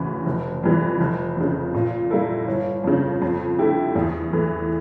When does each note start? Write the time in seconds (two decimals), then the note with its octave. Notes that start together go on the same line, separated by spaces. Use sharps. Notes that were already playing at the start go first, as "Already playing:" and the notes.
Already playing: D2 C#3 E3
0.26 F1
0.64 F2 E3 G3
1.01 F1
1.36 F2 C#3
1.74 A#2
2.10 G3 A#3 E4 A4
2.48 G1
2.84 F2 C#3
3.22 F2
3.59 D3 A3 E4 G4
3.96 E2
4.32 E3 A3